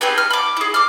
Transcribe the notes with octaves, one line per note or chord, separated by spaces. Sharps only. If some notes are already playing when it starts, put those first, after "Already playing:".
C4 G4 G#4 B4
F6
B5 D6
E4 G#4
D6 F6